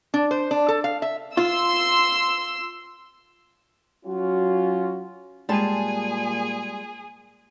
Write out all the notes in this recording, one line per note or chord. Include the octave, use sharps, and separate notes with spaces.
D4
C5
D4
A4
F5
E5
F4 C6 E6
F#3 C#4 F4 F#4
A#2 G3 G#3 G#4 G#5 A5